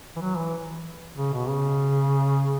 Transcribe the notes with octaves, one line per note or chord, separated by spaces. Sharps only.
E3
F#3
E3
C#3
B2
C#3